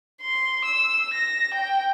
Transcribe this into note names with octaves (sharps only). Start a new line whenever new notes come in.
C6
E6
A#6
G5